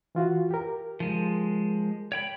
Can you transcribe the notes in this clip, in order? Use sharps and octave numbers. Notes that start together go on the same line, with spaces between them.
E3 F4 F#4
G4 A#4
F3 G#3
C#5 G5 B5